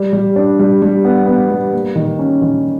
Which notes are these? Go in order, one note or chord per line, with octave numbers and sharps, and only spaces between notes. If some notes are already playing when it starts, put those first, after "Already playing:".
Already playing: G3
G3
D4
G3
G3
B3
B3
G3
A#3
D#3
C#4
D#3